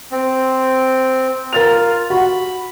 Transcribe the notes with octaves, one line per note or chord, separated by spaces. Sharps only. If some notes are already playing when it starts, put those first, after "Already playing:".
C4
F4 A#4 A6 F7
F#4 B5